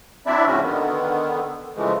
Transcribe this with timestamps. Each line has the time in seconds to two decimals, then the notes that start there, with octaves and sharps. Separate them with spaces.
0.26 F#3 C4 D4 E4 D5 E5
0.46 A2 C#3 F3 C#4 F#4
0.63 D3 D#3 B3
1.76 C#3 E3 F3 G#3 A3